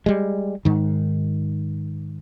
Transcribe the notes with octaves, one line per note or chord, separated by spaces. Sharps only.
G3 G#3
G#2 D#3